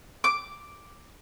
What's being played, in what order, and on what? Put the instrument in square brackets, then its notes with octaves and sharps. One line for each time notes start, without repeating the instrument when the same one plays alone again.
[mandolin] D6